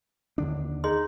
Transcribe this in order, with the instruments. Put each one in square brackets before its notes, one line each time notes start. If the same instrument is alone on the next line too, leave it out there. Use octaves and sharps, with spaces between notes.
[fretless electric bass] D#2 D3 D4
[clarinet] D#4 [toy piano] G#4 D#5 C6